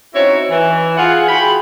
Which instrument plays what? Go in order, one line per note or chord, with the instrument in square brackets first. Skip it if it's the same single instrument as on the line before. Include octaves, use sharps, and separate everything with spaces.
[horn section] C4 C#4 D#4 E4 F#4 C#5
E3
F4 G#4 F#5
E4 F#4 G#4 G5 B5